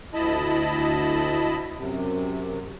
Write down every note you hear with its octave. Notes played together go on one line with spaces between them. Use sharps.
D2 E4 D#5 A5 B5
F#2 C3